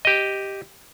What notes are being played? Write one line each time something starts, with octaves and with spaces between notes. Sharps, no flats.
G4 D#5